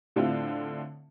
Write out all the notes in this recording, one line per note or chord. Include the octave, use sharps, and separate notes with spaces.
A2 D3 C4 E4 F4